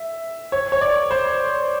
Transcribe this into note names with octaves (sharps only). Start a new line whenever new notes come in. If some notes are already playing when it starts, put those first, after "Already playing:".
Already playing: E5
C#5
C#5
D5
C5